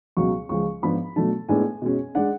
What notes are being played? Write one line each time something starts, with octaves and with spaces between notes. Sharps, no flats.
C#2 B2 F#3 C#6
C#2 C#3 F3 G#3 C#6
G#2 F3 B3 D4 B5
B2 F#3 A3 D4 A5
A2 G#3 B3 D4 G#5
B2 G#3 C#4
G#3 D4 F#5